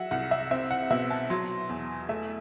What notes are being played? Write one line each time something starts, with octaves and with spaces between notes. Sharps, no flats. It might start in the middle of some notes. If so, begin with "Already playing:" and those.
Already playing: F#3 E5 F#5
C2 F#5
E5
C4 E5
F#5
B2 E5
A5
F#3 C6
E2
A3 E5